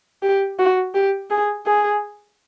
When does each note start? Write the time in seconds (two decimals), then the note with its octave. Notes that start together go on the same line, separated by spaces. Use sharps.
0.23 G4
0.59 F#4
0.94 G4
1.31 G#4
1.66 G#4